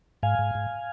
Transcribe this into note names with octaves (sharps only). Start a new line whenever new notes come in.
G#2 F5 G#5
G#2
G#2